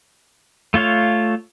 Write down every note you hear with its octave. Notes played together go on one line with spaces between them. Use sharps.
A3 F4 C#5 F5